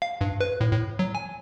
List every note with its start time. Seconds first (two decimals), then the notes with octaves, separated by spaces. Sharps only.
0.02 F5
0.21 G2
0.41 B4
0.61 A2
0.73 A2
0.99 F#3
1.15 G#5